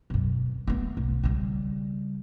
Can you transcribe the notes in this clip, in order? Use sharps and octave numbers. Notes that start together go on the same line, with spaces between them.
E1 F#2
A3 B3
B1
C#3 G3